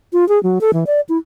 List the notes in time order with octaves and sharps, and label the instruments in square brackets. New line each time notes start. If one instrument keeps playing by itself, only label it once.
[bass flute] F4
G#4
F#3
A4
E3
D5
E4